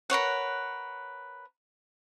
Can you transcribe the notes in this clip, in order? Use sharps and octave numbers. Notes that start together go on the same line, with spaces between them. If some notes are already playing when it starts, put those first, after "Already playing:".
A#4 B4 C#5 F#5